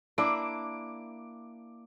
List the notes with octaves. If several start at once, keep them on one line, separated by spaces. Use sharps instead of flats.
A#3 D4 E4 D6